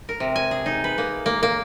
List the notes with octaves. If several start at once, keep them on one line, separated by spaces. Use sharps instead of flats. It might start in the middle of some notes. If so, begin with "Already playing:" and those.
A#4
C3
G#5
G#4
D#4
B4
A#3
A#3
A#3